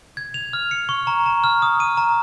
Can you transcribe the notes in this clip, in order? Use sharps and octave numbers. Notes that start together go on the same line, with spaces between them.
G#6
F7
F6
C#7
C#6
A#5
A#5
F6
D#6
D#7
A#5